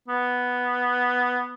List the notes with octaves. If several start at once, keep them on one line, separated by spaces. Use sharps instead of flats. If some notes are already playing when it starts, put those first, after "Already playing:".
B3